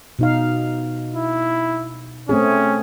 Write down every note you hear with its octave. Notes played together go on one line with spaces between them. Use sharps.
B2 D#4 F5
E4
A3 C4 C#4 G#4